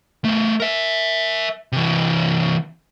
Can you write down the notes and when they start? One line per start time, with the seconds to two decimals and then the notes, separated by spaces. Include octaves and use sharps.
0.25 A3 B3
0.60 A#4 E5
1.72 C3 E3